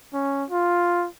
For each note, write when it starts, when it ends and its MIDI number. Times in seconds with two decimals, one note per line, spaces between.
0.13 0.44 61
0.50 1.07 65